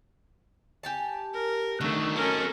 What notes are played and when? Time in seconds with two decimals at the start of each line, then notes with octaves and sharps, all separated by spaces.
0.83 G4 G#5 A5
1.33 A#4
1.81 D3 D#3 A3 F#4
2.16 C#4 A4 A#4 D#5